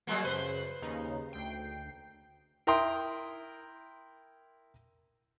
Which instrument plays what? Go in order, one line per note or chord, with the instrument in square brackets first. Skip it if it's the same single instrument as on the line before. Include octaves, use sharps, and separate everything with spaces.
[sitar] F#3 G#3 A#3 [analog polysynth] F#4 F#5 A5
[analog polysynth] F#2 C#3 F#6 [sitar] B4 C5
[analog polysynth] D#2 C#3 D#4
D2 G5 C7
[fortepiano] E4 A#4 G5 A#5 C6 D#6